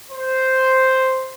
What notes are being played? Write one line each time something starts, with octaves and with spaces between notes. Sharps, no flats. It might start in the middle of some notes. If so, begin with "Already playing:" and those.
C5